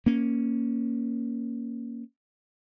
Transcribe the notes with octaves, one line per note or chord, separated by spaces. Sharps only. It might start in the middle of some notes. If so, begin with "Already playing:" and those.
A#3 C#4